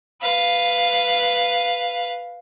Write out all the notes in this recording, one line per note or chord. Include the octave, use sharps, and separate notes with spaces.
B4 F5